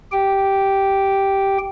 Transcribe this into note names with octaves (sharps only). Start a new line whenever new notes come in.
G4 G5